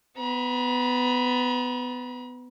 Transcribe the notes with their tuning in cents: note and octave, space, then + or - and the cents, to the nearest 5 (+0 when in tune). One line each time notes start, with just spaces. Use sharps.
B3 +20 A#5 +45